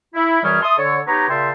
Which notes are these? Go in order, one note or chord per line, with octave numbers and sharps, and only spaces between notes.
E4
F#2 E3 G3 G#4 C#5 F6
E5 A5 C6 D#6
D3 A4 C#5
B3 D#4 G4 B4 C#5 A#5
A#2 C#3 E5 G5 A5 C6